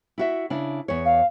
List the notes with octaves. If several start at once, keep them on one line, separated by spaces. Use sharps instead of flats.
E4 F#4 E5
C#3 D4 E4
E2 C#5
F5